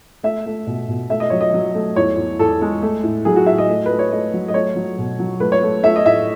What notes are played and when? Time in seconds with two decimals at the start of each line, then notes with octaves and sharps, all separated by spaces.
0.23 A3 E5
0.46 A3
0.67 B2
0.88 B2
1.10 A3 E5
1.20 D#5
1.30 F#3 C#5
1.41 D#5
1.54 F#3
1.75 A3
1.96 E2 C#5
2.17 E2
2.39 E2 A4
2.61 G#3
2.82 A3
3.03 A2
3.25 F#3 G#4
3.36 F#4
3.46 A2 E5
3.58 D#5
3.69 A3
3.86 A3 B4
3.99 C#5
4.11 A3 D#5
4.34 F#3
4.48 D#5
4.54 A3 C#5
4.76 F#3
4.98 B2
5.19 F#3
5.40 A3 B4
5.52 C#5
5.63 A3
5.83 A3 E5
5.96 D#5
6.05 A2 E5